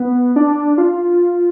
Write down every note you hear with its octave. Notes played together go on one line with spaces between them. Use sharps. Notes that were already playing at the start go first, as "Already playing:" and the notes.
Already playing: B3
D4
F4